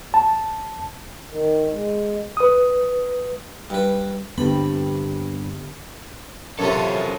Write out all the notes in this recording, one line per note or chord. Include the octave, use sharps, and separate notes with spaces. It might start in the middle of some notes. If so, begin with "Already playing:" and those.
A5
D#3
G#3
B4 D#6
G2 B4
G2 D3 B3 C4 G4 B5
F#2 C3 F3 C#4 A4